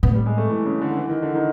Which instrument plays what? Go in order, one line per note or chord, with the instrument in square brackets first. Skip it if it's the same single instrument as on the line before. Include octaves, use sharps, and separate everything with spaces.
[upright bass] A2 [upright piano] B3
[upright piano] G3
G#3
A3
E3
C#3
D3
E3
D#3
D3
D#3